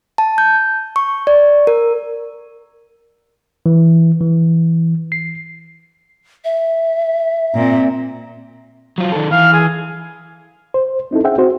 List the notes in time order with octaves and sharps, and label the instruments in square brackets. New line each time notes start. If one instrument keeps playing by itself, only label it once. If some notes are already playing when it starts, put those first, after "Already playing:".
[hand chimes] A5
G6
C#6
D5
A#4
[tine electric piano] E3
E3
C7
[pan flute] E5
[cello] A#2 C4
[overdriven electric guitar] F#3 F4
D#3 A4
[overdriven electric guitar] E3 [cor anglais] F5
[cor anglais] G#4
[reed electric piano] C5
C4 D#4 E4 A4
C#4 G#4 C5 E5 F#5 G5
C4 F#4 C5